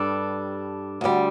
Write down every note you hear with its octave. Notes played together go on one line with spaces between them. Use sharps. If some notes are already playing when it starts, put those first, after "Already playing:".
Already playing: G2 G3 D4 A4
D2 D3 G3